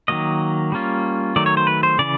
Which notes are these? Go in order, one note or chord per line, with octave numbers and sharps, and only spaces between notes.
D#3 F#3 A#3 D#5
G3 A#3 C#4 F4
D#3 F#3 A3 D5
C#5
C5
B4
C5
C#3 E3 D5